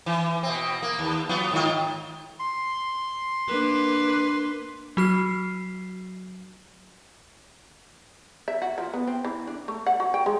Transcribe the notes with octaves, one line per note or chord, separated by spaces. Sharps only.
E3
B2 C4
A#3
D#2
F#3 B3 F4
G#2 D#3 F4
C6
A#3 D4 B4
F#3 F#4 F6 C7
E5
F#4
F3
B3
C4
E3
D4
A3
F#5
F#4
G5
G#3